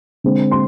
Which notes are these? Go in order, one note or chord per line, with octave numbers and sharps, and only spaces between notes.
D3 G#3 C4
C6